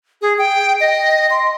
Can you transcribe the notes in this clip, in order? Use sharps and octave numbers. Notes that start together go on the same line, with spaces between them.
G#4
G5
D#5
C6